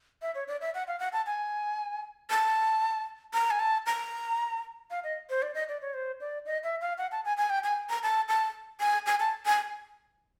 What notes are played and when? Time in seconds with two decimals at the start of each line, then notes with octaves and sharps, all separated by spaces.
0.22 E5
0.35 C#5
0.48 D5
0.61 E5
0.74 F#5
0.87 F5
1.00 F#5
1.13 A5
1.26 G#5
2.30 A5
3.33 A#5
3.51 G#5
3.60 A5
3.86 A#5
4.91 F5
5.04 D#5
5.30 C5
5.42 D5
5.55 D#5
5.69 D5
5.82 C#5
5.94 C5
6.20 D5
6.46 D#5
6.64 E5
6.81 F5
6.98 F#5
7.12 A5
7.25 G#5
7.37 G#5
7.50 G5
7.64 G#5
7.90 A#5
8.03 A5
8.28 A5
8.80 G#5
9.06 G#5
9.20 A5
9.46 G#5